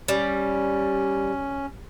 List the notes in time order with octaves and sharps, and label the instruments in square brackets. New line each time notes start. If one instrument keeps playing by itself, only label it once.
[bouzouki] G3 [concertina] C#4